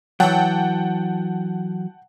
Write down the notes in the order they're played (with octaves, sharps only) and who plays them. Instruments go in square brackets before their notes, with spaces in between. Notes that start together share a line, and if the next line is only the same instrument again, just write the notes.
[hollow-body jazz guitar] E3 F#3 [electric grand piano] F#5 G5 A5